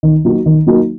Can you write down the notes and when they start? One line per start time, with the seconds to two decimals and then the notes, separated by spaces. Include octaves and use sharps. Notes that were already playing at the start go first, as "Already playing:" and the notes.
0.03 D#3
0.25 F#3 A#3 D#4 F#4
0.46 D#3
0.67 F#3 A#3 D#4 F#4